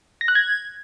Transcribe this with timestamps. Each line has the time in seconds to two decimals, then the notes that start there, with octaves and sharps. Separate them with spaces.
0.21 A#6
0.28 F#6
0.35 G#6